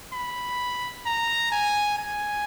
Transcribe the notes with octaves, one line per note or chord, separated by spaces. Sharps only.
B5
A#5
G#5
G#5